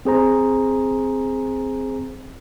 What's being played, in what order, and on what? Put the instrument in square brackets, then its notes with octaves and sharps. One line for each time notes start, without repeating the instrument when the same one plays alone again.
[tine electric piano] C4 G#4 C5 A#5